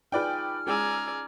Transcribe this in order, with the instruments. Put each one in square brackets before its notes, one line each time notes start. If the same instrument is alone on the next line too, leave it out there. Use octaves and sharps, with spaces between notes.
[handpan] D#4 F4 G#4 [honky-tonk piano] B4 D5 G5 [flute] F6
[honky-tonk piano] G#3 E6 [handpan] C#4 [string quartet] D5 G#5 A#5